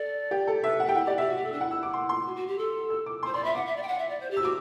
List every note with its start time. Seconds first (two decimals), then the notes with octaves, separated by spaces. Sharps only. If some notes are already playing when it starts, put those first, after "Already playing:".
Already playing: A4 D5
0.31 G4
0.47 A4
0.64 B4 E5
0.80 F#5
0.85 G4 G5
0.95 E4 F#5
1.04 G4 D5
1.18 G4 E5
1.28 F#4
1.36 G4
1.44 A4
1.52 D4
1.60 E4 F#5
1.71 E6
1.83 D6
1.93 C6
2.09 C6
2.25 F#4
2.36 F#4
2.47 G4
2.58 A4
2.90 E6
3.06 D6
3.23 C6
3.26 C5
3.33 D5 C6
3.43 E5 B5
3.55 F#5 D6
3.66 E5
3.76 D5
3.82 G5
3.87 F#5
3.98 E5
4.09 D5
4.20 C5
4.30 G4
4.37 E6
4.41 F#4 D6